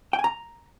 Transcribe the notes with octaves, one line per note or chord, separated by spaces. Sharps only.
G5
G#5
A#5